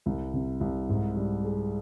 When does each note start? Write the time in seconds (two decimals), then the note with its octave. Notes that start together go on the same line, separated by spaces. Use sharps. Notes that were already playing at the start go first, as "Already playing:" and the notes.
0.06 C2
0.34 C3
0.60 C2
0.89 G#2
1.16 G3
1.44 G#4